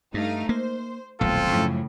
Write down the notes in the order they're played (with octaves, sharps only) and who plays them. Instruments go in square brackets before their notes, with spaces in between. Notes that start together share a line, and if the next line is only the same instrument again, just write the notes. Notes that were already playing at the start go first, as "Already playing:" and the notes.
[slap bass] G2 [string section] A3 D#4 F5
[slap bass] A#3 [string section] C5
[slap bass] D#1 B1 [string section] A2 F3 [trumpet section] C4 F4 A4
[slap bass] F#2 F3 [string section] A2 C#3